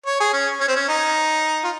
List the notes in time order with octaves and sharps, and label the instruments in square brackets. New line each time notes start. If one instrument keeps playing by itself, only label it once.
[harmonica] C#5
G#4
C#4
C#4
C4
C#4
D#4
F4